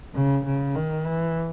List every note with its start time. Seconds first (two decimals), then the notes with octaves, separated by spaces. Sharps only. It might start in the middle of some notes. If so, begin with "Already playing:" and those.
0.15 C#3
0.45 C#3
0.76 D#3
1.07 E3